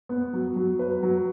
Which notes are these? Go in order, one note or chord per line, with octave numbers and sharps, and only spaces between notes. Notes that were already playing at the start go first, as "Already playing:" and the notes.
B3
F#3
F#3
B4
F#3